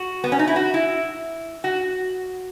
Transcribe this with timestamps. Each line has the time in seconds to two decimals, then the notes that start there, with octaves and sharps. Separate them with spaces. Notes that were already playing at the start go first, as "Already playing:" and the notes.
Already playing: F#4
0.24 B3
0.32 C#4
0.39 D#4
0.47 E4
0.56 F#4
0.74 E4
1.64 F#4